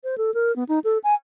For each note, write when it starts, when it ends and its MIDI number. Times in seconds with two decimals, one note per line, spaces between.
0.04 0.18 72
0.18 0.33 69
0.34 0.54 70
0.56 0.64 59
0.69 0.79 63
0.84 0.98 69
1.04 1.14 80